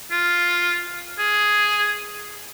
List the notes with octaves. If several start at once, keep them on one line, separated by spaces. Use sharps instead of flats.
F4
G#4